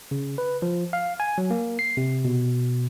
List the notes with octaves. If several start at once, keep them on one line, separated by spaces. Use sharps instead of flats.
C#3
B4
F3
F5
G#5
F#3
A#3
C7
C3
B2